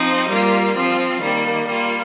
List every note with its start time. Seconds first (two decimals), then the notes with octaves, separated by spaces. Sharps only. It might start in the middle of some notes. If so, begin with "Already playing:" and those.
Already playing: F3 C4 D#4
0.27 G3 A#3 F4
0.75 F3 C4 F4
1.22 D#3 G3 A#3
1.68 G3 A#3 F4